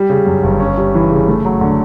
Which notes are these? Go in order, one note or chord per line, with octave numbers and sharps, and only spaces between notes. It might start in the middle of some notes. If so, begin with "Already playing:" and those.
Already playing: G3
C#3
F#2
G1
C#4
G3
E3
C#3
A3
F#3
D3